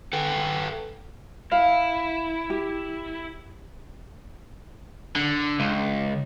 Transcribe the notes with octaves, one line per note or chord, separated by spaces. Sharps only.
A4 B4 G5
E4 F5
G4
D3
C#2